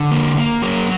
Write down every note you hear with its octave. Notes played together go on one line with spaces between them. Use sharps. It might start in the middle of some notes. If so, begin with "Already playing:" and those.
Already playing: D3
A#3
A#3
F#3